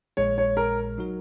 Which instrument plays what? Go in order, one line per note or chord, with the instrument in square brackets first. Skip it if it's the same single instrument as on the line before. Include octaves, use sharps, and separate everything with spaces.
[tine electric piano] A#1 A#2 G#3 [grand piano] C#5
[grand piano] C#5
A#4
[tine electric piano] F#3 D#4 F#4 A#4